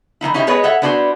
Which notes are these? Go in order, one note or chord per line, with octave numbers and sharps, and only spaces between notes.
E3 A#3 D#4 E4
C#4 D#4 E4 G4
G#3 B3 G#4 B4 C#5 D#5
A4 C#5 E5 F#5
B3 D4 E4 F#4 A#4 C5